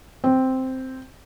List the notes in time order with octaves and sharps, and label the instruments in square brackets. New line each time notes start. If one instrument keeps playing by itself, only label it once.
[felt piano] C4